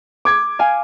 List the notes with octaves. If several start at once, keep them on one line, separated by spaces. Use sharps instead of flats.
D6 G#6
F5 G#5